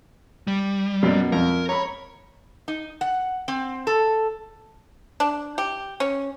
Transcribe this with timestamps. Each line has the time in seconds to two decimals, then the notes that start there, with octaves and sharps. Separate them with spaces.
0.47 G3
1.03 F#2 B2 D5
1.32 F2 A#4
1.69 C#5 A#5 B5
2.68 D#4
3.01 F#5
3.48 C4
3.87 A4
5.20 D4
5.58 G4
6.00 C#4